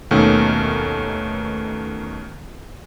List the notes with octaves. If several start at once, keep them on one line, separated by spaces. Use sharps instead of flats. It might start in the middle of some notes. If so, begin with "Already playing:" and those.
D#2 B2 D#3 A3 C#4